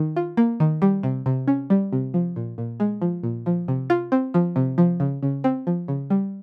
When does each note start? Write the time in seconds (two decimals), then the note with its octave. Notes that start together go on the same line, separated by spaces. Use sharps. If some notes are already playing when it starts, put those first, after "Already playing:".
Already playing: D#3
0.16 F4
0.37 A#3
0.60 D#3
0.82 G3
1.03 C3
1.26 C3
1.48 C#4
1.70 G3
1.92 C3
2.14 F3
2.36 A#2
2.58 A#2
2.80 G#3
3.02 F3
3.23 A#2
3.46 F3
3.68 C3
3.90 F4
4.12 C4
4.34 F3
4.56 C3
4.78 F3
5.00 C#3
5.23 C#3
5.44 C4
5.67 F3
5.88 C#3
6.10 G3